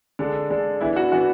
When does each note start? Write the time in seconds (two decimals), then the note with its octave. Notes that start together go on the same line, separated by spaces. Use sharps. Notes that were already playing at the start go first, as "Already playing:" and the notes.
0.19 D3 G#3 D4 A4
0.50 D3 G#3 D4 A4
0.81 E3 B3 D4 E4
0.96 F#4
1.12 E3 B3 D4 F#4